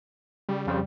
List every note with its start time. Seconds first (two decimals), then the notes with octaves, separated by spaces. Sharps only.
0.49 C#3 G3
0.67 F2 C#3 G3 C5